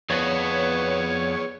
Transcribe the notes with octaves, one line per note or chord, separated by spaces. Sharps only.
F2 B3 G#4 B4 C#5 D5